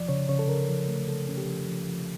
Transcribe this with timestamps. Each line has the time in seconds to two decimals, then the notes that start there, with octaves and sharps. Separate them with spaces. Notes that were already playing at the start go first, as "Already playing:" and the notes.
Already playing: F3 D5
0.08 C#3 C#5
0.29 C#3 C#5
0.39 A4
0.48 C#3 A#4
0.68 F3
0.88 A3
1.07 C#3 A4
1.28 C#4
1.37 G4
1.47 F3
1.68 F3
1.87 F3